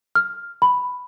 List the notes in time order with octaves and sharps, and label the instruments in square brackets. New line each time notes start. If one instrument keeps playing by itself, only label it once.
[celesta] F6
B5